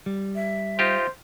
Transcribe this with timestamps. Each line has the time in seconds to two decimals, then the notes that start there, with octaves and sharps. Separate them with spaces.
0.06 G3
0.35 E5
0.79 D#4 F4 G4 C5